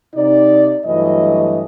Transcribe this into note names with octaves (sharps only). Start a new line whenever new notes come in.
C3 D#4 D5
G2 E3 F#3 A3 D#5